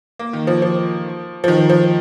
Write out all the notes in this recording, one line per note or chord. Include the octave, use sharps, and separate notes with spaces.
A#3
D#3
F3
F3
F3
D#3
F3